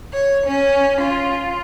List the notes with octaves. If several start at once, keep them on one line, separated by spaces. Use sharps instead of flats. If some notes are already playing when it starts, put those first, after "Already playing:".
C#5
C#4
F4